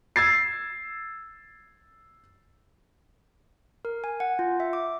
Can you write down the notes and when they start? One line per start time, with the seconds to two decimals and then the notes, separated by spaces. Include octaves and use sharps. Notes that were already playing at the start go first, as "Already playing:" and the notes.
0.16 E6 G#6 A6 C7
3.85 A#4
4.04 G#5
4.20 F#5
4.39 F4
4.60 E5
4.73 D6